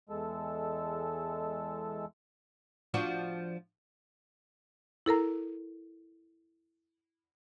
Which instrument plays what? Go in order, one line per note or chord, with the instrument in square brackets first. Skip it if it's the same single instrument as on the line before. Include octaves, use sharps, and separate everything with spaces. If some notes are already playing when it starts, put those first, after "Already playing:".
[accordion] E2 G#3 A4
[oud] F3 D4 F#4
[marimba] E4 A4 A#4 A#5